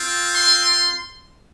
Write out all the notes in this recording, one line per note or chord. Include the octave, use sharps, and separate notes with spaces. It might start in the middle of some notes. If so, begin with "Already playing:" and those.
Already playing: C4 F4
C6